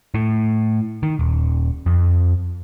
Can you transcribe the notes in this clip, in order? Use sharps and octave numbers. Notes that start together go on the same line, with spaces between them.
A2
D#3
D#1
F2